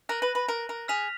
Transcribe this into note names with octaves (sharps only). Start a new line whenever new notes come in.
A#4 F#6 A#6 D#7 F#7
B4
B4
A#4
A#4
G#4 F6 B6 F7